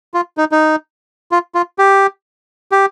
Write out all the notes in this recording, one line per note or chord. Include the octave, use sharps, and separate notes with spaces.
F4
D#4
D#4
F4
F4
G4
G4